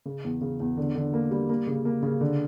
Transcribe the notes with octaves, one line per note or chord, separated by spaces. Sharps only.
C#3
E2
C#3
E2
D3
D3
A#3
G3
A#3
C#3
A#3
C#3
D3